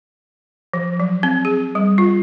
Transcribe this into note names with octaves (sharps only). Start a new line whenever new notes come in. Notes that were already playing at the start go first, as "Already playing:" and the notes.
F3
F#3
C4
G#4
G3
F4